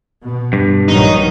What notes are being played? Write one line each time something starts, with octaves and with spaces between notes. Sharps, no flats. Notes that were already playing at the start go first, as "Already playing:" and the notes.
B2
G2
A#1 D#3 F#3 D#4